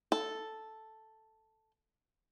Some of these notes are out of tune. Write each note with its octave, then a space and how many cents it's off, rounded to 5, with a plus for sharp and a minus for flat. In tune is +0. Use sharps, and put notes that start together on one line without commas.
A4 +0